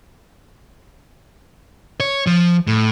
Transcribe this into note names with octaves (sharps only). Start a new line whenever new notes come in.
C#5
F3
A2